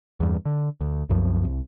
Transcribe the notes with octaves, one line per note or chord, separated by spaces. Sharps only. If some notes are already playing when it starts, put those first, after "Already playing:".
E2 G2
D3
D2
C2 F#2 F3
C2